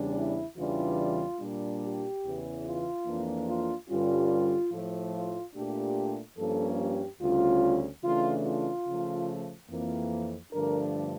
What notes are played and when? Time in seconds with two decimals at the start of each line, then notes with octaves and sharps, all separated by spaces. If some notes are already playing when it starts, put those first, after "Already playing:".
Already playing: E2 C#3 G3 D4
0.16 E4
0.57 E2 C#3 E3 G3 D4 F4
1.40 A#2 G3 D4
1.82 G4
2.23 E2 C#3 E3
2.64 F4
3.06 F2 E3 A#3 D4
3.48 F4
3.89 G2 D3 G3 C#4 F4
4.72 A2 F3 A3
5.13 F4
5.55 A#2 A3 D4 G4
6.38 G2 F3 A#3 C#4 A4
6.80 G4
7.21 D2 C#3 G3 C#4 F4
8.04 C#3 E3 A3 D4 F4
8.45 F4
8.86 C#3 F3 A3
9.70 F2 E3 A#3
10.52 G2 D3 F3 A3 D4 A#4